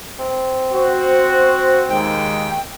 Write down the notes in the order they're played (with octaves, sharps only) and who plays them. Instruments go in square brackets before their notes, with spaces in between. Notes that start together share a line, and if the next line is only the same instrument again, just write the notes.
[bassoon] C4
[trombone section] F#4 C5
[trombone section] D#2 D#3 G#3 [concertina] G5